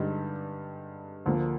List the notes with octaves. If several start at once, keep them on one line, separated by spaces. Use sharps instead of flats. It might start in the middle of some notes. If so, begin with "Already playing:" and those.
Already playing: G2 D3 G#3 D#4 G4
D2 D3 F3 A#3